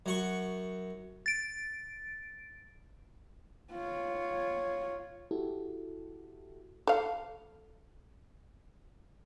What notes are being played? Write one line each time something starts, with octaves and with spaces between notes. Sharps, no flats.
F#2 F#5 C#6
A6 D7
F4 C#5
E4 F#4 G4 A4
A4 F5